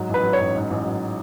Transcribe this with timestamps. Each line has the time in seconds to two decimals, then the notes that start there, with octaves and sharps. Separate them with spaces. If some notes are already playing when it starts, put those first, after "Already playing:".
Already playing: G#2 F#3
0.09 A1
0.14 B4
0.23 F#3
0.33 C#5
0.39 A1
0.55 G#2
0.70 A1
0.85 F#3